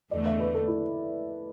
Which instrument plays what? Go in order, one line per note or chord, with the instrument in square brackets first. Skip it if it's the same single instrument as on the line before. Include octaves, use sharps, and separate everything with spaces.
[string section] E2 D3 A3 [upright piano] D5
[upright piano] E5
B4
A4
E4